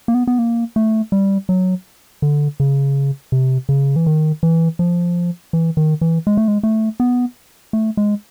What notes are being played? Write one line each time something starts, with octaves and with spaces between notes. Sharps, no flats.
A#3
B3
B3
A#3
A3
G3
F#3
D3
C#3
C3
C#3
E3
D#3
E3
F3
E3
D#3
E3
G#3
A3
G#3
A3
B3
A3
G#3